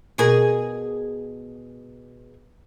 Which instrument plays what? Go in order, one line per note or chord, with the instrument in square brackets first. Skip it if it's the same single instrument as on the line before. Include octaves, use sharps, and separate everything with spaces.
[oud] B2 G#4 A#4